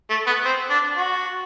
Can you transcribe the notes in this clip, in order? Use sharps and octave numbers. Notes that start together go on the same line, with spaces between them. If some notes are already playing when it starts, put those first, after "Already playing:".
A3
B3
C4
D4
F#4